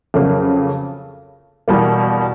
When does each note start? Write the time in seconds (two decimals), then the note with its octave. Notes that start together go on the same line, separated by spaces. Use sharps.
0.14 F2 C#3 F#3 A#3
1.68 E2 B2 G3 A#3